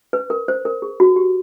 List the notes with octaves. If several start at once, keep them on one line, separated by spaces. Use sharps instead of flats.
B4
A#4
C5
A#4
G#4
F#4
G4